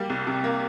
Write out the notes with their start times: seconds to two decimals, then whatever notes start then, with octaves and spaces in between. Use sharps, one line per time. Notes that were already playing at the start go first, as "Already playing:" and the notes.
Already playing: G3 A#3
0.10 C2
0.27 C3
0.44 A#3